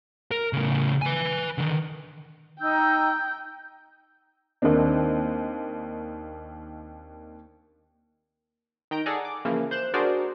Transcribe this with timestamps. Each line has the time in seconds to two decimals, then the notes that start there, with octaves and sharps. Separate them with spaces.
0.31 A#4
0.53 A2 C#3
1.02 B4 G#5
1.58 D3 D#3
2.61 D#4 G5 E6 G6
4.62 D#2 D#3 A#3 C4 D4
8.91 D#3 G5 A#5 G6 D7
9.06 G#4 A4 D5 F#5 G#5 A#5
9.25 D6
9.45 C#3 E3 F3 A#3
9.71 C5 F#6 G6 E7
9.94 D4 F#4 G#4 A#4 C5 D5